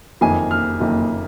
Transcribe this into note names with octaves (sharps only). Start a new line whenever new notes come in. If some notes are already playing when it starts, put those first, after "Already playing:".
F#1 F2 D#3 A#3 G#5
F6
F#1 F2 D#3 A#3